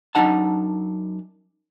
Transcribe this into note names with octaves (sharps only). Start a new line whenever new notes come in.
F#2 B3 D4 D#4 F#5 A5